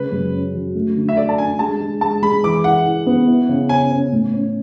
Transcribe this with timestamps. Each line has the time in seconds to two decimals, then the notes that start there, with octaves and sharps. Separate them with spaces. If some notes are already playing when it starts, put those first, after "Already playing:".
Already playing: C#3 G#3 B4
0.12 F#2
0.33 C#4
0.54 F#3
0.75 A3
0.96 D3
1.09 E5
1.17 A4 D5
1.29 A5
1.38 D4 G#5
1.59 G#3 A5
1.80 G#3
2.01 G#3 A5
2.22 G#3 B5
2.43 E3 D6
2.64 E4 F#5
2.86 E4
3.07 B3
3.28 E4
3.49 C#3
3.69 C#4 G#5
3.91 C#4
4.12 A2
4.34 C#4